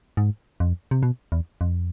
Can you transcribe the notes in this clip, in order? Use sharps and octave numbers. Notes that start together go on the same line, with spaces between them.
G#2
F2
C3
B2
E2
F2